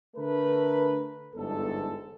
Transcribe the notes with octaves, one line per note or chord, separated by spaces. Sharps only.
D3 A3 A#4 B4
G1 E2 G#2 A4